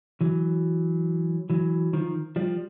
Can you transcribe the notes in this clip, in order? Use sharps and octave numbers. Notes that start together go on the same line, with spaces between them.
E3 F#3
E3 F#3
D#3 F3
F3 G3